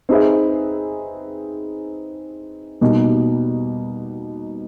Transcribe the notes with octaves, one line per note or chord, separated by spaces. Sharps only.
C4 D#4 G#4 B4 E5
B2 G3 A#3 D#4